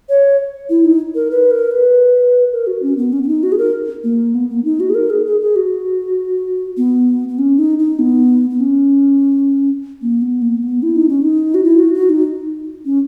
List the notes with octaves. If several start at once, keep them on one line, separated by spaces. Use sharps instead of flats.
C#5
E4
D#4
A#4
B4
A#4
B4
A#4
F#4
C#4
B3
C#4
C#4
D#4
F#4
G#4
A#4
A#3
B3
A#3
D#4
F#4
G#4
A#4
G#4
G#4
G#4
F#4
B3
B3
C#4
D#4
D#4
B3
B3
C#4
A#3
B3
A#3
B3
E4
D#4
C#4
D#4
F#4
E4
F#4
F#4
D#4
C#4